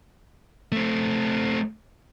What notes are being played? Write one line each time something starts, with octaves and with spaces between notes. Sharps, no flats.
A3 C4